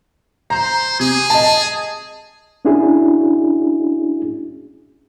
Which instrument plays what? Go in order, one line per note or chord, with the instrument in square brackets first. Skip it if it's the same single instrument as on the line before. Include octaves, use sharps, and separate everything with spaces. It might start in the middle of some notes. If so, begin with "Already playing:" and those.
[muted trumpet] C5 [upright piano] A#5
[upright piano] C3 [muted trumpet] G#4
[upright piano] D#5 A5
[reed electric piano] C#4 D4 E4 F#4 G#4